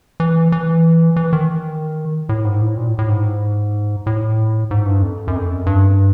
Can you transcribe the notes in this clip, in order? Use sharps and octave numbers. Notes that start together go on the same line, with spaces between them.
E3
E3
E3
D#3
A2
G#2
A2
A#2
A2
A2
G#2
A2
G#2
G2
F2
F#2
F2
F#2
G2